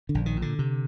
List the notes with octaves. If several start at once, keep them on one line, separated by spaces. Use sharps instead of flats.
D3
A#1
D#3
A#2
D3
C3